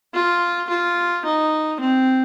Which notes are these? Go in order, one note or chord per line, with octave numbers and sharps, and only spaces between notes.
F4
F4
D#4
C4